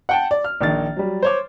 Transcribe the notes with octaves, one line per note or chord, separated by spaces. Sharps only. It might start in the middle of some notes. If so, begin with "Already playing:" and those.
F#5 G5 A5
D5
F6
A#1 D#3 A6
F#3 G3
C5 C#5 D6